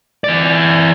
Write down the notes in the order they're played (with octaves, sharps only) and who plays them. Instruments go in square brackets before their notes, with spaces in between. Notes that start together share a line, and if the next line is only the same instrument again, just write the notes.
[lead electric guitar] E3 D5